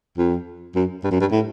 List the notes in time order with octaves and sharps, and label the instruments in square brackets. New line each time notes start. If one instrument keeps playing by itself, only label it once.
[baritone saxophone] F2
F#2
G2
F#2
G2
A2